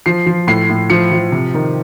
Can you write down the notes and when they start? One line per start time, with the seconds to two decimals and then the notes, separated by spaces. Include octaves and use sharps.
0.06 F3 C7
0.26 F3
0.48 A2 C7
0.69 A2
0.90 F3 C#7
1.12 F3
1.32 C3
1.54 D#3